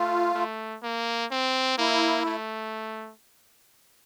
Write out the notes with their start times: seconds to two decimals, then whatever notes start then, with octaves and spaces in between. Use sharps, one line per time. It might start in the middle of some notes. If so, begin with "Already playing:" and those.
Already playing: A3 F4
0.34 A3
0.82 A#3
1.31 C4
1.78 A#3 E4
2.26 A3